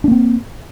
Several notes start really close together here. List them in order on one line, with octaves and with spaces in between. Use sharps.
D4 A#3 C4